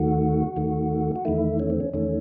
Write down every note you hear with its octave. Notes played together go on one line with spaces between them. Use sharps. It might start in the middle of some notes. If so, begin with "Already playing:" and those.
Already playing: D#2 D#3 A3 F#4
D#2 D#3 A3
F#4
E2 D#3 A3 E4
C#4
C4
C#4
E2 D#3 A3 C#4